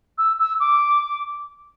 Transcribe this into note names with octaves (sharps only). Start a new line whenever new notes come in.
E6
E6
D6